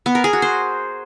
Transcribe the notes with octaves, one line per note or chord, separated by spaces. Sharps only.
B3
A#4
G#4
F#4
C5